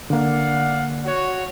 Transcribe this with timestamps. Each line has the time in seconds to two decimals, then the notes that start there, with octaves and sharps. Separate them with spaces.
0.10 D3 A#3 D5 F5 F#5
1.05 F#4 C#5